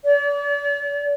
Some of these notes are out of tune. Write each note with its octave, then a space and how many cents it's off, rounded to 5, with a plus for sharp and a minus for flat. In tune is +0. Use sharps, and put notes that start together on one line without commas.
D5 -40